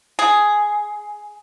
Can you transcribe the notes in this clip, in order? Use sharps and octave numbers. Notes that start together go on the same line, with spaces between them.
G#4